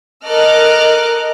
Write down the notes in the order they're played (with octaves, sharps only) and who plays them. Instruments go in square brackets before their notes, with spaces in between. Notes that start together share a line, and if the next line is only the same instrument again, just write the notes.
[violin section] A4 A#4 D#5 D6 F6 F#6